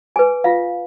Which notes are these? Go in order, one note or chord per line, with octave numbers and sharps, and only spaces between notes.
G#4 B4 G#5
F4 F5